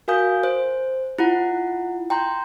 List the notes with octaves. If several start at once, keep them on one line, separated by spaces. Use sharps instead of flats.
F#4 A#4 F5 G#5 D#6 G6
C5
E4 F4 F#5
G5 A#5 C6 G6